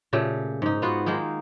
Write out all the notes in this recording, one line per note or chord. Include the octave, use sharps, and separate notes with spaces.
A#2 C#3 A3 G4
G#2 D#4
B3 F4 F#4
D#3 G#3 A#3 D#4